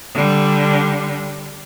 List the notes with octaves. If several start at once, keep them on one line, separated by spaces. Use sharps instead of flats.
D3 G3